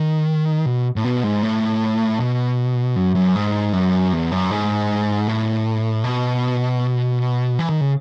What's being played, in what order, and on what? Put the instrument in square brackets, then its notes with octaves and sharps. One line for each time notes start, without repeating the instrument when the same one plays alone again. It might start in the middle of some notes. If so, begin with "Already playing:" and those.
Already playing: [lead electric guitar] D#3
B2
A2
B2
G#2
A2
B2
F#2
F#2
G#2
F#2
E2
F#2
G#2
A2
B2
E3
D#3
C#3